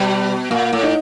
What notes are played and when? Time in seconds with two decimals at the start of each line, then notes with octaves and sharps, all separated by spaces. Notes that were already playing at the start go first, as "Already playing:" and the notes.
Already playing: B2 G3
0.50 A#2 A#3
0.73 A2
0.83 D#4